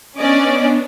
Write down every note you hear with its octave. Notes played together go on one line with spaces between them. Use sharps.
B3 C#4 D4 D5 D#5